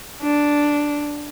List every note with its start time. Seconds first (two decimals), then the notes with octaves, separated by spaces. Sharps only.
0.22 D4